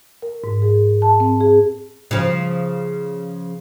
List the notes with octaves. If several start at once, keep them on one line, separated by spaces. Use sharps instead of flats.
A#4
G#2
G#4
A5
C4
G#4
C#3 F3